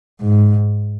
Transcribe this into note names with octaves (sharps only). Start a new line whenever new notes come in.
G#2